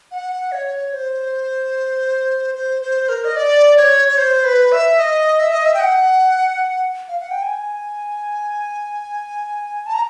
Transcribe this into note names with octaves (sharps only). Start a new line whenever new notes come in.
F#5
C#5
C5
C5
C5
A#4
D#5
D5
C#5
C#5
C5
B4
E5
D#5
E5
D#5
E5
G5
F#5
F5
F#5
G5
G#5
A5
A#5